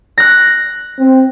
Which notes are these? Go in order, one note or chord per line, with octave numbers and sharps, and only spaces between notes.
F#6 A#6
C4